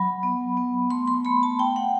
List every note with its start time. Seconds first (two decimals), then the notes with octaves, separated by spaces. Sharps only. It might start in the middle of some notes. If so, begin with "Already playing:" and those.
Already playing: F#3 B5
0.23 B3
0.57 B3
0.90 A3 C6
1.08 C6
1.25 A3 B5
1.43 A5
1.59 A3 G5
1.76 F#5